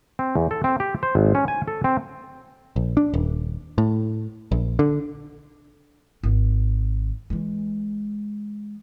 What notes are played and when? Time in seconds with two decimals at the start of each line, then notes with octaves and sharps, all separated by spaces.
0.19 C4
0.35 E2
0.51 A4
0.64 C4
0.80 G4
1.03 C5
1.15 G#1
1.35 C#4
1.48 G#5
1.68 A4
1.84 C4
2.76 A#1
2.97 D4
3.14 D#1
3.78 A2
4.52 A#1
4.79 D3
6.23 G#1
7.30 E3 G#3